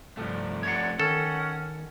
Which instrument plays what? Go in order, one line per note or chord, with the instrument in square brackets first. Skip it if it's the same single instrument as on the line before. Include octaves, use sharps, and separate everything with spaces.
[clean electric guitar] C2 G2 [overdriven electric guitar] F3 A3
[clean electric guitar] C#5 D5 F#5
[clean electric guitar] D#3 [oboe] C#4 [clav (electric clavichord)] A4 [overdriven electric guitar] F#5